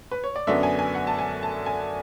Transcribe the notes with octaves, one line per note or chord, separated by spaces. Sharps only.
B4
C#5
D5
F#2 D3 F#3 B3 D4 E5
G#5
G#5
F#5
A5
G#5
A5
G#5